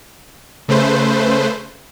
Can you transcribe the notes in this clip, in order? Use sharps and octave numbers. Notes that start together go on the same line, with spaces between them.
C#3 A3 B4 C5